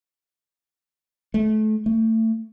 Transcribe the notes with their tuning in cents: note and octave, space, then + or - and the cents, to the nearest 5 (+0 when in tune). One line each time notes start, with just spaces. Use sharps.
A3 -30
A3 +25